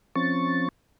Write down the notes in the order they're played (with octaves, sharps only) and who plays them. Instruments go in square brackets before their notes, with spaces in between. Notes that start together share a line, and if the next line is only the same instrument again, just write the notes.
[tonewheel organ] F3 C4 C#4 C#6 A6